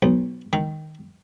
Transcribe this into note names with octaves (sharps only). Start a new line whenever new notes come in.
B1
D#3